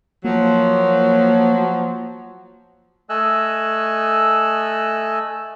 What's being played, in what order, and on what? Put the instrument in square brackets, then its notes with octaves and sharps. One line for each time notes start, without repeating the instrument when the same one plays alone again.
[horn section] F3 F#3 [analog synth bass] A#3
[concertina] A3 A4 D#5 G#5 E6 F#6